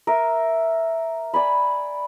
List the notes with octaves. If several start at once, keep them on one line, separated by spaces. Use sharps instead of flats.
A#4 E5
D5 G#5 B5